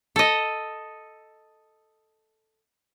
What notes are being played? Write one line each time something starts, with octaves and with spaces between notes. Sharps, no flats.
A4 D#5